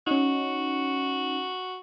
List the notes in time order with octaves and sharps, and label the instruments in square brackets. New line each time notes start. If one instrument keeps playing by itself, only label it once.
[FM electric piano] C#4 D#4 [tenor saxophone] F#4